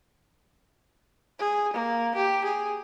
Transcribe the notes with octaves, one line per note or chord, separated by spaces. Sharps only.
G#4
A#3
G4
G#4